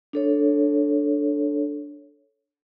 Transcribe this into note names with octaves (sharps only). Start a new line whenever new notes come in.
D4 A4 C#5